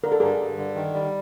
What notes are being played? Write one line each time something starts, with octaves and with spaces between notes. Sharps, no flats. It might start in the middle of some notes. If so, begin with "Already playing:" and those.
D3 A#4
A4
G2 G#4 A#4
G2
D3
D#3
G3